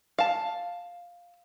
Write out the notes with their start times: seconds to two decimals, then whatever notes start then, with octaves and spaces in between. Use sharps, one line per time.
0.19 F5 A5